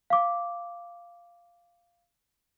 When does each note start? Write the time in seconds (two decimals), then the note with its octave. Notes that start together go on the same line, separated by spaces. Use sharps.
0.10 F5 D6